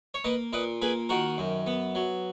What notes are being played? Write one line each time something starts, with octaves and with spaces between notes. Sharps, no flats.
C#5
A#3 B4 D#5
A#2 B4 D#5
A#3 G#4 B4
D#3 F#4 A#4
F#2
B3
F#3